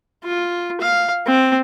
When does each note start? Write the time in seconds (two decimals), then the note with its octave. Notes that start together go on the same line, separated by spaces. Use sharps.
0.24 F4
0.81 F5
1.27 C4